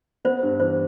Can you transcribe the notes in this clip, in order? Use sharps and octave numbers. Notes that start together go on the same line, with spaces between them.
B3 C5
G2
E3 C5